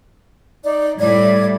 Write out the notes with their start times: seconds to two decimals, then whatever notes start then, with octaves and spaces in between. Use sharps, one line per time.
0.64 D#4 D5
1.00 A2 G3 E4 D5 G#6